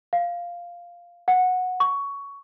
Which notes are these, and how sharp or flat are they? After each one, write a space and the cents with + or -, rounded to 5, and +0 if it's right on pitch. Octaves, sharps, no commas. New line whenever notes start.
F5 +0
F#5 -15
C#6 +15